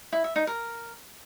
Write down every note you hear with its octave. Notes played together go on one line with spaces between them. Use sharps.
E4
E5
D#4
A#4